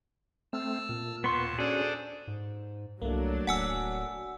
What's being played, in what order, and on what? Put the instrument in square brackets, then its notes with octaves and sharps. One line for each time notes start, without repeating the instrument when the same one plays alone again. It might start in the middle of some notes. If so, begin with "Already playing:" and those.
[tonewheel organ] A3 C4 [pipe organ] A5 E6 F6
[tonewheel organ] A#2
[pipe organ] D#2 A5 [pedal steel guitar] B3 C6 [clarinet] C#6
[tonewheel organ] C#4 F#4 [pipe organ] D4 A4 C5 [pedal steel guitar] G#4 [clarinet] D5
[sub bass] G#2
[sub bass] C2 [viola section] F#3 D4 [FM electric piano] A3 A#3
[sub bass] D1 [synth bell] F#5 G#5 E6